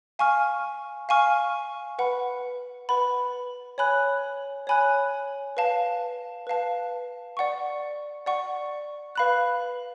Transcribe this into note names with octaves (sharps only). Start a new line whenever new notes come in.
F5 G#5 C#6 F6
F5 G#5 C#6 F6
B4 F#5 B5
B4 F#5 B5
C#5 G#5 B5 F#6
C#5 G#5 B5 F#6
B4 F5 A5
B4 F5 A5
D5 F#5 C#6
D5 F#5 C#6
B4 F5 B5 F#6